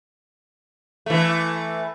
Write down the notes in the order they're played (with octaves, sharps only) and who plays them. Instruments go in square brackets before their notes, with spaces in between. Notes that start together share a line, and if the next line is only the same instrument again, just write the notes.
[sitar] E3 A3